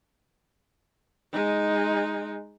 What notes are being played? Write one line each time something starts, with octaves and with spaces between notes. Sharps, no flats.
G#3 D#4